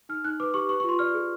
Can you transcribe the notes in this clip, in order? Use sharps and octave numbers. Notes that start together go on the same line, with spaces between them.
D#4 F6
D#4 F#6
B4 D6
G4 C#6
B4 C#6
F4 C#6
C6
D5 F6
G#4